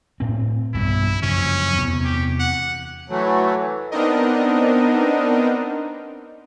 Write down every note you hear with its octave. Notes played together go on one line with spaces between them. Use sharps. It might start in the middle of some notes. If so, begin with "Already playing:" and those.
A2 C4
B1 G2 B2 E4
F#2 C#3 F3 C#4
E2 C3
G4
F#5
E3 F#3 A3
B3 C4 D4 D#4 A#4 D#5